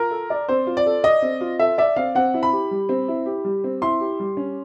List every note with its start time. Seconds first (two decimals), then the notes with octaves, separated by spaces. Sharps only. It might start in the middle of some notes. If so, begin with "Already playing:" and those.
Already playing: F4 A#4
0.11 A4
0.30 D5
0.49 C4 C5
0.67 F4
0.77 D5
0.86 A4
1.04 D5 D#5
1.22 C4
1.41 F4
1.59 A4 E5
1.78 D5 E5
1.96 C4 F5
2.15 C4 F#5
2.34 E4
2.43 B5
2.52 G4
2.71 G3
2.89 C4
3.08 E4
3.26 G4
3.44 G3
3.64 C4
3.82 E4 C6
4.00 G4
4.20 G3
4.37 C#4